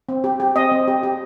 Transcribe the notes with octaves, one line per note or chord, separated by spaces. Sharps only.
C4
G4
G4
C4 D#5
C4
G4
G4